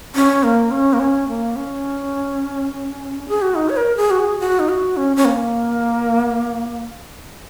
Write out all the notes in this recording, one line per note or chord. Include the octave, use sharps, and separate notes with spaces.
C#4
A#3
C#4
A#3
C#4
A#3
C#4
G#4
F#4
D#4
C#5
A#4
G#4
F#4
G#4
F#4
D#4
F#4
C#4
C#4
A#3